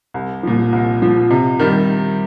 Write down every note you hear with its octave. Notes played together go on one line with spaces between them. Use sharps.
C2
A#2 F3
C2
A#2 F3
C3
D#3 G3